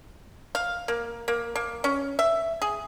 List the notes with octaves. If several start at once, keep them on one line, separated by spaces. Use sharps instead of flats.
F5
A#3
A#3
A#3
C#4
E5
G#4